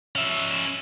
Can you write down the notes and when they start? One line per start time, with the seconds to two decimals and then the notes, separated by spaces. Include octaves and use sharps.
0.16 C#4 E5